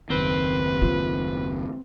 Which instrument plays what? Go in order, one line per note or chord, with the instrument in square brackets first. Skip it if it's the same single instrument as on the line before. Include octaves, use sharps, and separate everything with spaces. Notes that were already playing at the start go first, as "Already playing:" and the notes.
[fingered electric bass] F#1 D#2 D#3 [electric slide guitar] C4 C5 [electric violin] B4
[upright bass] F4